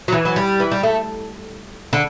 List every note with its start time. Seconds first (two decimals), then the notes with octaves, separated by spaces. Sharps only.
0.08 F#3
0.12 E3
0.25 F#3
0.36 G3
0.60 E3
0.72 G3
0.83 A3
1.93 D3